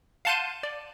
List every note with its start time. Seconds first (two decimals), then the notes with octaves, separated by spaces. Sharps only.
0.25 F5 F#5 A5 C6 G6 D#7
0.63 D5